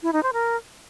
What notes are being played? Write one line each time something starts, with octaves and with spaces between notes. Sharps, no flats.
E4
D#4
C5
A#4